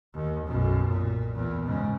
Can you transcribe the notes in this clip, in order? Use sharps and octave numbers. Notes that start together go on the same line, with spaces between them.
D#2
B1 F#2
A#2
E2 A#2
G#2 C#3